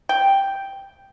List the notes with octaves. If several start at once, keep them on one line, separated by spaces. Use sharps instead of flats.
G5